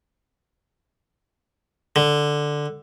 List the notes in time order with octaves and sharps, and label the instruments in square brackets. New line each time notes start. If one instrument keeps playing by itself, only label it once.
[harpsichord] D3